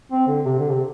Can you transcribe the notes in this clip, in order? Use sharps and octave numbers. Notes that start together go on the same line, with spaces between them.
C4
D3
C3
D3
C3